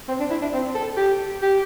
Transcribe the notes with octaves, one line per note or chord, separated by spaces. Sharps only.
C4
D4
E4
D4
C4
A4
G4
G4